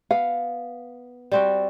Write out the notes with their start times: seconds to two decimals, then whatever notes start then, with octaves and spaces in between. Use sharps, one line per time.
0.11 B3 F5
1.31 G3 C4 F#4